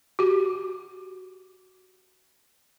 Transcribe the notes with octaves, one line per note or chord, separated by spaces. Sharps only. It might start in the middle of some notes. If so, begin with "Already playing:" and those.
F#4 G4